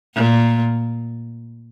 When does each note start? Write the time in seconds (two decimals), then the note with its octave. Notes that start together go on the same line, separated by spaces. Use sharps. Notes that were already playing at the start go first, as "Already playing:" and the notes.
0.16 A#2